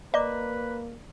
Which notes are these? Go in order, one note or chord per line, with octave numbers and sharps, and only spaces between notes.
A#3 B4 D5 D#5 A#5 D6